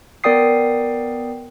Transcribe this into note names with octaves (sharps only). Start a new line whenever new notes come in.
B3 A#4 D5 G5 D#6 C7